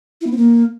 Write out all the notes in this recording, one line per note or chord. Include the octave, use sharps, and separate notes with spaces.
E4
B3
C4
A#3